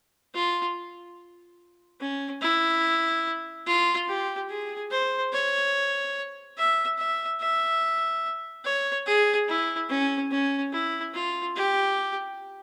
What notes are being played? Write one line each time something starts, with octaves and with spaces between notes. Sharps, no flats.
F4
C#4
E4
F4
G4
G#4
C5
C#5
E5
E5
E5
C#5
G#4
E4
C#4
C#4
E4
F4
G4